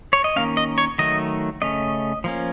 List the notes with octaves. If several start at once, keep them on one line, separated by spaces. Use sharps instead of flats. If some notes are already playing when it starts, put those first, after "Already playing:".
C#5
D#5
D#3 A#3 C#4 F5
D#5
C#5
D#3 F#3 A3 D#5
C#3 A3 C#4 D#5
F3 A#3 C#4